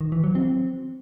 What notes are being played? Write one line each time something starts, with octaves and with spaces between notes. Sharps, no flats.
D#3
E3
F#3
C4